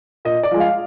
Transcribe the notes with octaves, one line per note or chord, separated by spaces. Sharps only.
A#2 D#5
D5
F3 G#3
F5